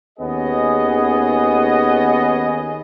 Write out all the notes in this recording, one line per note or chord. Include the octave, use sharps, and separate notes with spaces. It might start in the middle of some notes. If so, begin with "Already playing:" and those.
D#2 B3 C#4 G#4 D#5